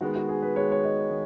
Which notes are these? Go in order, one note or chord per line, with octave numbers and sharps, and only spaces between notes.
D#3 G#3 B3 F#4
F#4
G#4
B4
D#3 G#3 B3 C#5
C#5
D#5
D#3